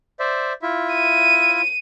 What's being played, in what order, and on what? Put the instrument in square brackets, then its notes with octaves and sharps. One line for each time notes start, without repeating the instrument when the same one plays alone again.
[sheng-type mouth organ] C5 D5 E5
E4 F4 E5
[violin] D#7